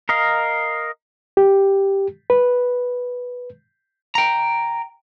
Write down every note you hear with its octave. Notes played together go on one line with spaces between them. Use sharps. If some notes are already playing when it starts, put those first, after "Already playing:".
A#4 D#5 F5
G4
B4
G5 A#5